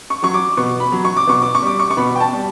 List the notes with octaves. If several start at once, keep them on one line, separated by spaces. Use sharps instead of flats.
C#6
F#3 C#6
D6
B2 C#6
B5
F#3
C#6
D6
B2 C#6
D6
C#6
G3 D6
C#6
C#6
B2 B5
G5
A5
G3